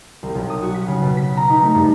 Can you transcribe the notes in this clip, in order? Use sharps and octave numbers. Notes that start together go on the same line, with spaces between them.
C2
B1
D#6
F#4
B6
C#3
B2
B6
A#5
D#4
A3
G2